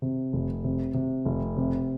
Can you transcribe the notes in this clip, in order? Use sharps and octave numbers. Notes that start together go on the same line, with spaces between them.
C3
F1
C3
C3
F1
C3